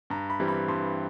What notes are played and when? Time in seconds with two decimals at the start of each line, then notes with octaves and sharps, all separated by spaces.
0.10 G2 A#5
0.30 B5
0.40 E3 G3 C4
0.48 B5
0.68 G2 C6